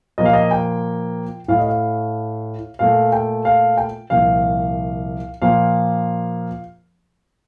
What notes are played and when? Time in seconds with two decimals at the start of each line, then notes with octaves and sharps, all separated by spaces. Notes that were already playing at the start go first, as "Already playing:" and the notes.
0.18 A#2 F3 A#3 D#5
0.25 F5
0.33 D#5
0.51 G5
1.48 A2 A3 F5
1.59 D#5
1.68 F5
2.79 A#2 A3 F5
3.12 G5
3.45 F5
3.77 G5
4.10 C2 A#2 F3 A#3 F5
5.42 A#2 F3 A#3 F5